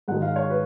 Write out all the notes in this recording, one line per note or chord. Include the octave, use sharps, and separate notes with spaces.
G#2 D#3 G#3 F#5
F5
C#5
B4